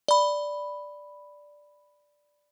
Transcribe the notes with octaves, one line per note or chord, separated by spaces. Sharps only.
D5 B5